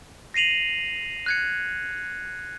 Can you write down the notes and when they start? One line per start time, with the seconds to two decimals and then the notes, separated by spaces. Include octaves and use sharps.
0.34 A#6 C7 D#7 F7 F#7
1.26 F#6 G#6 C#7